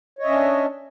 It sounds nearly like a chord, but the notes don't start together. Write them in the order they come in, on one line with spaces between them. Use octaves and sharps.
C#5 D#5 E5 C#4 D4